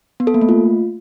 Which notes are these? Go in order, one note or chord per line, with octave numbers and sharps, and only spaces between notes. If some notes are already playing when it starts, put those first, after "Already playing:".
B3
A4
A#3
A3
F4